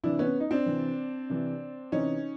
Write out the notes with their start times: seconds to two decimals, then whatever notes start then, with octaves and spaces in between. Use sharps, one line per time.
0.04 C3 E3 D4 E4
0.19 B3 C#4
0.40 D#4
0.51 C4 D4
0.66 C3 E3
1.30 C3 E3
1.92 C3 E3 C#4 D#4